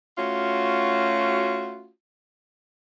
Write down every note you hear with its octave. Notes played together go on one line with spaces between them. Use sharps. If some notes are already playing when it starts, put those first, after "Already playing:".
A3 C#4 F4 F#4